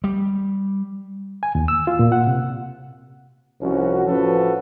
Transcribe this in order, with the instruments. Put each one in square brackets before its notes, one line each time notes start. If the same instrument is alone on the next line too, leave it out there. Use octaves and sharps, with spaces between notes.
[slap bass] G3
[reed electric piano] G#5
D#2
E6
F4
A#2
F#5
C3
[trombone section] C2 F3 C#4 F#4
A1 F3 C#4 F#4 A4 B4